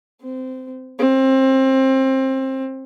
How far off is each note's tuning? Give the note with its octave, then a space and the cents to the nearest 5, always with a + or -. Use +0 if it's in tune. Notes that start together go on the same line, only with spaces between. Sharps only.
C4 -20
C4 +25